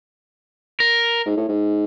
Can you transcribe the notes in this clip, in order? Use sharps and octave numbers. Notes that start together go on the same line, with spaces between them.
A#4
G#2
A2
G#2